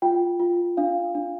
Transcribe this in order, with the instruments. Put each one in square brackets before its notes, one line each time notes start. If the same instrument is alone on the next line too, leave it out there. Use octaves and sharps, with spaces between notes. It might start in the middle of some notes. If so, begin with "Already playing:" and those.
[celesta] F4 G5
F4
D4 F5
D4